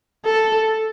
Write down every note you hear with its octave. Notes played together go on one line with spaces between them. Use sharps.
A4